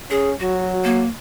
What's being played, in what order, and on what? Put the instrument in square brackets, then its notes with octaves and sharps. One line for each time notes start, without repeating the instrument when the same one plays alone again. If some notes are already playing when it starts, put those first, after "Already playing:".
[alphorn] C#4 [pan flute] G#4
[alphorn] F#3 [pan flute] F#4
[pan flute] A#3